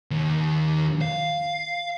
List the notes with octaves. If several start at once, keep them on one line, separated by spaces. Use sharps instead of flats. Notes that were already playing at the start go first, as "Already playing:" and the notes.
D#2
F5